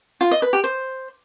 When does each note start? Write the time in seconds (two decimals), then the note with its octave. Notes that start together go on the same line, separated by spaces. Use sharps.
0.21 F4
0.31 D#5
0.42 B4
0.53 G4
0.64 C5